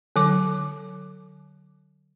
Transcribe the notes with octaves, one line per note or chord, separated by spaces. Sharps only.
D3 F#3 D6